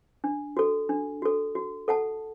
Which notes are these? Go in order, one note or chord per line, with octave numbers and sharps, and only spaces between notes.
D4
F#4 A4
D4
F#4 A4
F#4
A4 F#5 A5